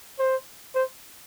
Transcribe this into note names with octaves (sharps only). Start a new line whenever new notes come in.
C5
C5